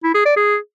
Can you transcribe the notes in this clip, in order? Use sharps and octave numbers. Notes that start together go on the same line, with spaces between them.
E4
G#4
D5
G#4